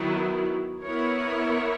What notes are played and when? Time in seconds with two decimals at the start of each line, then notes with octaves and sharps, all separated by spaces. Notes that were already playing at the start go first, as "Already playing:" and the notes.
Already playing: D#3 F#3 B3 E4
0.81 B3 E4 A#4 C#5